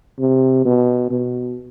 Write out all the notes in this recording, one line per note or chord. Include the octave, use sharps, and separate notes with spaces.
C3
B2
B2